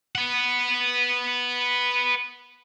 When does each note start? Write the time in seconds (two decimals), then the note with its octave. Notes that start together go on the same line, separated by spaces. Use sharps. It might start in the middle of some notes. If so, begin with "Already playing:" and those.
0.15 B4 F#5